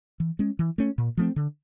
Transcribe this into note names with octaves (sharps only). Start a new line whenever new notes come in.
E3
G#3 C#4
E3
A3 C#4
A#2
F3 A3 C4
D3